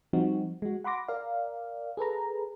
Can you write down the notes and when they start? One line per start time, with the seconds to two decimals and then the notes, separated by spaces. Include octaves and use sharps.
0.13 F3 G3 C4 D#4 F#4
0.62 G#3 F#4
0.84 F#5 B5 C6 D6 A#6
1.08 A#4 D5 F5
1.97 G#4 A4 B4 A#5